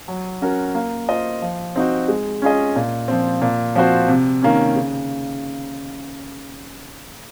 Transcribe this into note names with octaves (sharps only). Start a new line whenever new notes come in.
F#3
C#4 F#4 A#4
A#3
F4 C5 D#5
F3
C4 D#4 F#4
G#3
C#4 F4 G#4 D#5
A#2
F3 C4
A#2
F3 C4 F#4 C5
C3
D#3 A#3 C#4
C#3